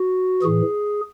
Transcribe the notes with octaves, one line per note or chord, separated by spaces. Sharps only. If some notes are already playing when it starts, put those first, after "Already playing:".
Already playing: F#4
A2 E3 G#4